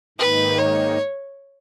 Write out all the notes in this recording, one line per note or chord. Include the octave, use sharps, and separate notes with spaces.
G#2 D#3 A#3 D#4 B4
C#5